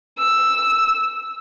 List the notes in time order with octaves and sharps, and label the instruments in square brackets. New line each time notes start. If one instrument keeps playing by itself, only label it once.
[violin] E6